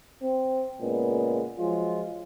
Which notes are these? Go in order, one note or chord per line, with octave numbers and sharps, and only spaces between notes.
C4
A#2 C#3 G#3 B3
F3 F#3 G#3 F4